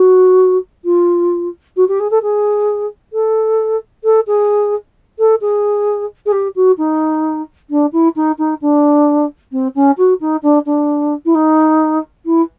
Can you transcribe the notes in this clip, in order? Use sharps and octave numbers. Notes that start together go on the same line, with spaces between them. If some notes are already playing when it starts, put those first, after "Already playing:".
Already playing: F#4
F4
F#4
G4
G#4
A4
G#4
A4
A4
G#4
A4
G#4
G#4
G4
F#4
D#4
D4
E4
D#4
D#4
D4
C4
C#4
F#4
D#4
D4
D4
E4
D#4
E4